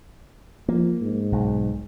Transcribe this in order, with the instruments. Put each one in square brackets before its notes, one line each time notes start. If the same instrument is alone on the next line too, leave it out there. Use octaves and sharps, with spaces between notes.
[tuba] F3 [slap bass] A#3
[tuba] G#2
[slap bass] B1